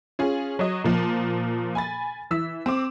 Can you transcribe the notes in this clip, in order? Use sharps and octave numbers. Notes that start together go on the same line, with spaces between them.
C#4 F4 G#4
F#3 C#5 D#5
A#2 F3
G#5 B5 A6
E3 E6 B6
C4 D6